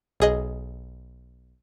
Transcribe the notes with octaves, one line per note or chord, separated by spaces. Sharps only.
B1 G#4 D#5